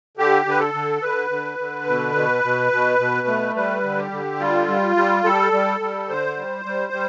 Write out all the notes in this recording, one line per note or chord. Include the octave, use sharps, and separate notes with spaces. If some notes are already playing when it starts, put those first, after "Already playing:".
D3 G4
D3 B4
A4
D3
D3 B4
D3
D3
B2
B2
B2
B2
B2
A3
G3 B4
D3
G4
D3
G3 F4
G3
G3
G3 A4
G3
G3
D3 C5
G3
G3
G3